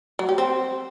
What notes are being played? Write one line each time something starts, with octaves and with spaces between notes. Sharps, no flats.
F#3
G4
C4